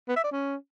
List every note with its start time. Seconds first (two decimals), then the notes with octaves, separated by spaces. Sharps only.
0.08 B3
0.16 E5
0.24 D5
0.32 C#4